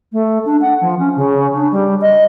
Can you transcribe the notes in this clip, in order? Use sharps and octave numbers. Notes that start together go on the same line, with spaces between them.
A3
D4
F#5
F3
C#4
C#3
D4
G3
D#5